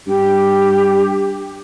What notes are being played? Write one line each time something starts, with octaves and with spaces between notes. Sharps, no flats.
G2 G4